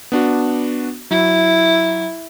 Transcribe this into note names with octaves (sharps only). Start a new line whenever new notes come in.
B3 D4 F#4
F#3 E4